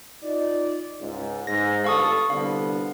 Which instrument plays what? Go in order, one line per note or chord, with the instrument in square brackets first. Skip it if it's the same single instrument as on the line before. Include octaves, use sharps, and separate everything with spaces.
[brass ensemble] D#4 F4 D5
C#2 G#2
[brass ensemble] G#2 [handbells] A#6
[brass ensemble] G1 A4 [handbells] F5 C#6 D#6
[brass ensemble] C2 D3 B3 [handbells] F5